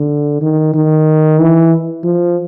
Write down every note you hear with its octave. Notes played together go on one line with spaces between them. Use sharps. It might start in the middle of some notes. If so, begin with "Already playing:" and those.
Already playing: D3
D#3
D#3
E3
F3